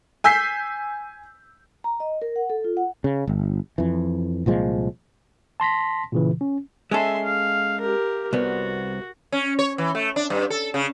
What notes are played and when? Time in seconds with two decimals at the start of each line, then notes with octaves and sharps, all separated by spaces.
0.24 G#5 E6 G6 B6 C7
1.84 A#5
2.00 D#5
2.22 A#4
2.36 F#5
2.50 A4
2.64 F4
2.77 F#5
3.04 C#3
3.27 G1
3.78 F2 E3
4.46 C2 A#2 F3 G#3
5.60 A5 C6 A#6 B6
6.12 A#2 C#3 E3
6.41 C#4
6.91 G#3 C#4 A4 E5 C6
7.24 F5
7.81 G4 A#4
8.33 C2 B3 F#4
9.32 C#4
9.59 C#5
9.78 E3
9.95 A3
10.16 D4
10.30 G2
10.50 A4
10.74 C#3